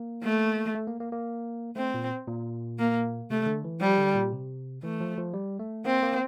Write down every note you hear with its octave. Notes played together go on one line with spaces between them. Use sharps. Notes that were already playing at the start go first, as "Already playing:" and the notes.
Already playing: A#3
A3
A3
A#3
A#3
A#3
A3 C4
A#2
A#2
A#3
C3 A3
D3
E3
F3 G3
D3
A#2
C3
E3 A3
F3
F3
G3
A3
A#3 C4
A#3